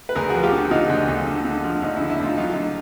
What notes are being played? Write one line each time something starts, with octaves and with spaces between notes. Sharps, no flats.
B4
D2 G#4 A#4
F3 F#4 G#4
F4 G4
D3
D3 D#4 F4
D2
D2
D3
D3
F3
D2 D#4
D3 E4
E4
D2 D#4 F4
F#3 D#4 F4
D3